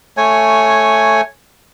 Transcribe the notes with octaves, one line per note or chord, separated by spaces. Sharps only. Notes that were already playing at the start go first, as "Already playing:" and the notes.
A3 C#5 G#5